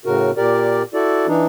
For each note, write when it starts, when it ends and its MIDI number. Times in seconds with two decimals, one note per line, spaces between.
0.06 0.31 45
0.06 0.31 49
0.06 0.31 66
0.06 0.31 70
0.37 0.83 46
0.37 0.83 67
0.37 0.83 70
0.37 0.83 74
0.94 1.27 64
0.94 1.27 66
0.94 1.27 69
0.94 1.27 74
1.27 1.47 52
1.27 1.47 62
1.27 1.47 63